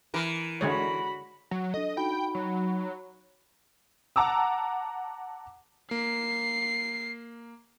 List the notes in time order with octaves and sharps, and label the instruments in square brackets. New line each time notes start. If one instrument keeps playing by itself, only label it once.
[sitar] E3 A#4
[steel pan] D3 G#3 C#5 [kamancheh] F#4 B5
[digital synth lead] F#3
[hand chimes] D4 A4 [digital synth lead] D#5
[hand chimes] D#4 F#4 B5 [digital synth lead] G5
[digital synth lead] F#3
[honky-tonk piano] F#5 A5 A#5 D6 E6
[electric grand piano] A#3 [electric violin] C7